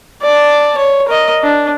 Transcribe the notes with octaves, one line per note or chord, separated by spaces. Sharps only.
D5 A5
C#5
A#4 D#5
D4